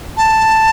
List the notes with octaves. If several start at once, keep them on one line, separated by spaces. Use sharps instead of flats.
A5